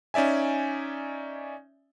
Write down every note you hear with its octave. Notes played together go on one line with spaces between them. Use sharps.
C#4 D#4 D5 E5 G#5